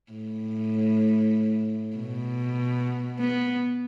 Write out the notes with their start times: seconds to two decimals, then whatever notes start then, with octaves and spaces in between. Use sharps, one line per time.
0.12 A2
1.96 B2
3.19 B3